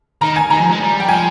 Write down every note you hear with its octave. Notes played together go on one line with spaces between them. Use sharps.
D#3 A#5
G#5
D#3 A#5
F3
G#3
G3
G5
F3 G#5